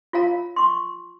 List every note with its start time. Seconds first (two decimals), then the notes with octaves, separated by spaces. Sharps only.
0.13 F4 C#5 F5 A#5
0.56 C6 C#6